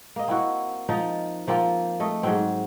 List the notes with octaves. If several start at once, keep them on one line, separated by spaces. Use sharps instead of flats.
A#3 D#5
C4 E4 F#4
F3 D#4 F4 D#5
F3 A#3 C4 F4
A3 D#5
G#2 F#3 C4